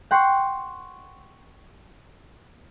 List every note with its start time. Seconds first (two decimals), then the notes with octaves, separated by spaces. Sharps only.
0.11 F#5 G5 C6 C#6 C7